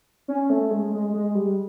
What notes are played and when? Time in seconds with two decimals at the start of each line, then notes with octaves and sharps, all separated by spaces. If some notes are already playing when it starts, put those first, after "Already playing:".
0.28 C#4
0.50 A3
0.71 G#3
0.93 G#3
1.14 G#3
1.35 G3